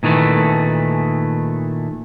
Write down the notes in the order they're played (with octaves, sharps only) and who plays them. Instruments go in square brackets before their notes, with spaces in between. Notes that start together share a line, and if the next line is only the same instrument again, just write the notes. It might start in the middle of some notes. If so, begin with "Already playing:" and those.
[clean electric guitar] A#2 D#3 E3 A3